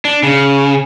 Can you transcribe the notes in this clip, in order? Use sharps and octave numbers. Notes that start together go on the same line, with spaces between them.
D4
C#3